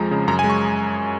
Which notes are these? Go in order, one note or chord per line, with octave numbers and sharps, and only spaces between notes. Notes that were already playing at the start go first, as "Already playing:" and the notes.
Already playing: F2 F3 G#3 A#5
C#3
F#2 A#5
G#5
G#3
C#6